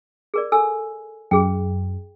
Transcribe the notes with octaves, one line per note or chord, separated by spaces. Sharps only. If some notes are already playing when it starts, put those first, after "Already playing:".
G#4 A#4 D5
A4 G#5 E6
F#2 G#4 G5